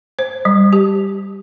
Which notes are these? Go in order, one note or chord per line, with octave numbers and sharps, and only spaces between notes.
C5
G3
G4